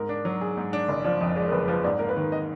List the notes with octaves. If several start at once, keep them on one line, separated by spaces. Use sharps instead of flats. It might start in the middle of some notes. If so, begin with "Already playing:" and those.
Already playing: G#2 A#4
D4
F#3
G#4
G#2
D4
F#1 D#5
F3 D5
F2 D#5
G#3 D5
A#4
F#1 B4
F3 B4
G#2 D5
A#3 A#4
B4
D#3
D#5